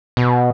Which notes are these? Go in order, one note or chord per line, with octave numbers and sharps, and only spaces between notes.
B2